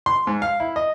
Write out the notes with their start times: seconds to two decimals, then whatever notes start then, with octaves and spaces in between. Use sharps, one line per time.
0.06 C6
0.27 G#2
0.42 F5
0.60 E4
0.76 D#5